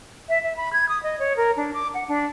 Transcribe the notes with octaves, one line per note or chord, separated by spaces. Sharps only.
E5
E5
B5
G#6
D#6
D#5
C#5
A#4
D4
D6
F#5
D4